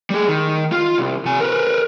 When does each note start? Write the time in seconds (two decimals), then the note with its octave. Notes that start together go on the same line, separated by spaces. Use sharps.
0.10 G3 G#4
0.29 D#3
0.72 F4
0.98 C2
1.25 C3 G#5
1.40 A#4 B4